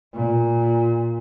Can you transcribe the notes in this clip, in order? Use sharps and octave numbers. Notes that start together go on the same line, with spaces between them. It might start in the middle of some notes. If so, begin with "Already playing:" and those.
A#2